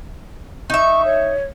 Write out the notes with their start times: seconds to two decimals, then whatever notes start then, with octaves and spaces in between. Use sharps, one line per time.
0.70 D#4 E5 C#6
1.04 C#5